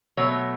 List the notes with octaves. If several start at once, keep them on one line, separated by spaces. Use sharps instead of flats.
B2 F#3 A3 C#5